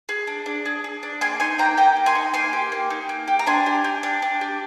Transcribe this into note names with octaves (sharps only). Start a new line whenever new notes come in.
G#4
D4
D4
G#4
G#4
D4
A#3 G#5 C6
D#4 G#5 C6
A#3 G5 A#5
G4 G5 A#5
A#3
G#5 C6
D#4
A#3 G#5 C6
G4
A#3
D#4
A#3
G4
A#5
D4 G#5 C6
G4
G4
D4
D4
G4